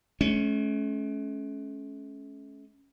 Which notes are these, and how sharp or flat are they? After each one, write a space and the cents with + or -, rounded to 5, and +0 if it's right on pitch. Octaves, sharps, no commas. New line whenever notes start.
A3 -45 C#4 +0